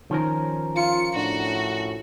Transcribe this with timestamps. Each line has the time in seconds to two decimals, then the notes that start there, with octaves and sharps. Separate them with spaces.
0.11 D#3 F3 C#4 A#4
0.76 F4 C#7
1.16 A2 D4 F#4